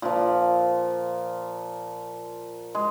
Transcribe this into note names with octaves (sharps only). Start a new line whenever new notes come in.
A#2 F3
G#3